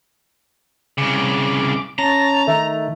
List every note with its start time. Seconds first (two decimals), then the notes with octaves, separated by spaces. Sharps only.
0.98 C2 C#3 D6
1.99 C#4 A5 A#5
2.48 D#3 A3